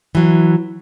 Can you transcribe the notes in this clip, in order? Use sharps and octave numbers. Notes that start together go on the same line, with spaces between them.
E3 F#3